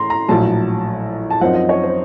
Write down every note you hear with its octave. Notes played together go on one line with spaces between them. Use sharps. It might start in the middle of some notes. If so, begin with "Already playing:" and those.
Already playing: A2 A#5 C6
A#5
A#1 A2 F#3 A5
A5
F#2 F3 C4 D#4 F#5
D#5
C#5
C5